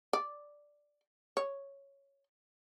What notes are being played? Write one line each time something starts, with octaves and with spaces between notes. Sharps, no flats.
D5
C#5